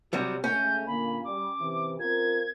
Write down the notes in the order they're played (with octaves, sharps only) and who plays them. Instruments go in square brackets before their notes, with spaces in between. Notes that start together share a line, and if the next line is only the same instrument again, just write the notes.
[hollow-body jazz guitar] C3 F#3 G3 [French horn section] G4 C#5
[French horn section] C#3 G#3 A3 [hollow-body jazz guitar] C#4 [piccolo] G6
[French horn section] A#2 D3 A#3 [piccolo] B5
[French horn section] G3 [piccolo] D6
[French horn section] C3 E3
[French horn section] C4 F4 A#4 [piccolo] G#6